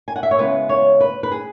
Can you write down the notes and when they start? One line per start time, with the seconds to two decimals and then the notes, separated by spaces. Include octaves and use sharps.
0.08 G#5
0.16 F#5
0.23 E5
0.31 C#5
0.38 C#3 G#3 B3 E4 B4
0.69 C#5
1.00 B4
1.23 B4
1.31 G#4